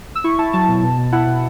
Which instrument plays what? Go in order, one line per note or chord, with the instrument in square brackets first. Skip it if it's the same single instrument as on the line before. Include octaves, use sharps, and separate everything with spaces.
[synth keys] E6
E4 C#6
E4 A5
F#3 A5
B2
B2
B2
E4 F#5
B2